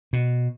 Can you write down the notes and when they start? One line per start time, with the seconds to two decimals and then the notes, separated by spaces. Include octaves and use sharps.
0.13 B2